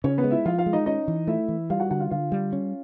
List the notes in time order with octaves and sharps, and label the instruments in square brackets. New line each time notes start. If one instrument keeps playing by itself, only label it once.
[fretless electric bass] C#3 [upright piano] C#4 C#5
[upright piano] B3 B4
[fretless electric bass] G#3
[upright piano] E4 E5
[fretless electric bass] F3 [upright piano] F4 F5
[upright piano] F4 F5
[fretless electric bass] G#3
[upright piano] D#4 D#5
[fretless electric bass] C#4 [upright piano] D#4 D#5
[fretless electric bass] E3
[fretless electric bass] A3 [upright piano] E4 E5
[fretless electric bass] E3
[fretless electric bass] G3 [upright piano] F4 F5
[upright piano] F#4 F#5
[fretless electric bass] D3 [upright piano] F#4 F#5
[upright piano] F4 F5
[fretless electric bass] D3 [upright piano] F4 F5
[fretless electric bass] G3
C#4